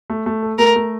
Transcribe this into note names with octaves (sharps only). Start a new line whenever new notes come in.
A3
A3
A4
A3 A#4
A3